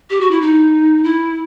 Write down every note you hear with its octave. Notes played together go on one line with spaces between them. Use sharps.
G4
F#4
E4
D#4
E4